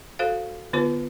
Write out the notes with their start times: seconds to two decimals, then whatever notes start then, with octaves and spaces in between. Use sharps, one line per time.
0.19 F#4 A4 C5 F5
0.73 D3 B3 F4 B4 C5